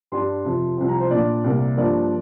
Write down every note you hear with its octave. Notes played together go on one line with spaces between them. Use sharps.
G2 G3 D4 C6
F2 C3 F3
C2 C3 F3
A#5
C5
A#2 A#3 D4 D5
C2 C3 A#3
G2 F3 A#3 D5